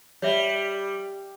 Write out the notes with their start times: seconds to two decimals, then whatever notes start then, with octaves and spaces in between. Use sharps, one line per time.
0.22 G3 C#5 E5